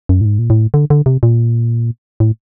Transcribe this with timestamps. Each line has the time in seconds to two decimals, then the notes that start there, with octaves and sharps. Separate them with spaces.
0.09 F#2
0.21 A2
0.25 G#2
0.39 A#2
0.50 A2
0.74 D3
0.90 D3
1.06 C3
1.23 A#2
2.20 A2